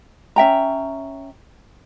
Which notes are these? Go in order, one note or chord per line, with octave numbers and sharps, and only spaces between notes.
C#4 E5 G5 A#5